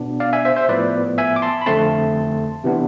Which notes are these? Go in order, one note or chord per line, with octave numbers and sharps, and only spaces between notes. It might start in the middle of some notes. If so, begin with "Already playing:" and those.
Already playing: B2 B3 D4
D5 F5
E5 G#5
C5 E5
C5 E5
A2 F3 B3 B4 D5
E5 G#5
D6
A5 C6
B5
F2 D3 A3 C4 A5 C6
C3 E3 B3 D4